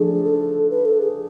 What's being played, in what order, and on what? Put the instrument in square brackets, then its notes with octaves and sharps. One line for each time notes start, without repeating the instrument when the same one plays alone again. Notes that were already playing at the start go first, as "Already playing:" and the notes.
Already playing: [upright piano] F3 A3 D4 [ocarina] G#4
[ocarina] A4
B4
A4
G#4